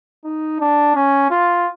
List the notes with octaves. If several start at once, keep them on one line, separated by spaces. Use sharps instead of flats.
D#4
D4
C#4
F4